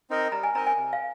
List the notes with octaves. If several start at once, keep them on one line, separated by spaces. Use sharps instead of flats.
C4 D#4 A#4 D#5
G3 A#5
G#5
C4 D#4 A#4 D#5 A#5
G#5
C3
F5